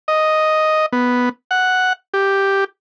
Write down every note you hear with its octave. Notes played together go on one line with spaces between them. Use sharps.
D#5
B3
F#5
G4